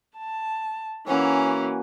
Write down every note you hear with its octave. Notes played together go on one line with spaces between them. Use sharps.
A5
E3 A#3 C#4 F#4 G#5